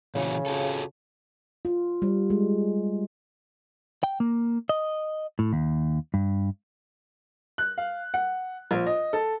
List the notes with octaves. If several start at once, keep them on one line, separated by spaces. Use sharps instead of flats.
A#2 C#3 E3 F#4
F4 F#4 A4
F4
G3
G#3
G5
A#3
D#5
A2
D#2
G2
F#6
F5
F#5
A#1
D#5
A4